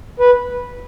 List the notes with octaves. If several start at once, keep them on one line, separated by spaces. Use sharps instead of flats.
B4